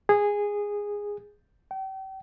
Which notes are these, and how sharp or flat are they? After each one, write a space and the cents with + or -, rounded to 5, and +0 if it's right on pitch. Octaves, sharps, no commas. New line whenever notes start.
G#4 -10
G5 -35